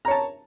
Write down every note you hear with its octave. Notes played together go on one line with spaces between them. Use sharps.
C#5 A5 A#5